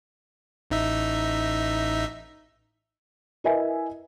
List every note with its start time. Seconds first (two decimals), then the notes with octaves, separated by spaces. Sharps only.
0.71 A1 D#4 E5
3.44 E4 A#4 B4 D#5 E5 G#5